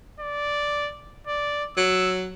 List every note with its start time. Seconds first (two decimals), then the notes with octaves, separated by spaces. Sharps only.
0.20 D5
1.27 D5
1.77 F#3 E6